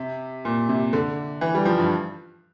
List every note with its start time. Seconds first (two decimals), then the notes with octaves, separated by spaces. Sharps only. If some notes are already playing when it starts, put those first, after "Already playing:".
Already playing: C3
0.45 A#2
0.69 C3
0.93 D3
1.41 E3
1.54 G3
1.65 F3
1.78 G2